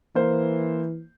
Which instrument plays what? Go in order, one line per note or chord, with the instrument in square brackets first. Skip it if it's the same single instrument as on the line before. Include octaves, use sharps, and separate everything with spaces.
[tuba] E3 [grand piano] A#3 C5